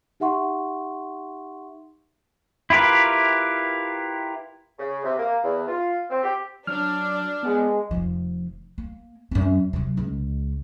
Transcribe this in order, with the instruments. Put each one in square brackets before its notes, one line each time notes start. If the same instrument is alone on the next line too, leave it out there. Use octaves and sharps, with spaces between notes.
[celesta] D#4 G4 E5 F#5 C6 C#6
[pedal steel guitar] E4 F4 G4 A#4 B4
[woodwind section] C#3
C3
A#3
E2
F4
C4
G4
[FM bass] F#3 [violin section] D4 [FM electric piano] F6
[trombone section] G#3 [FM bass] B3
[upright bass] F1 F3
A#3
F#2 C4
C3 F#3
C#2 G#3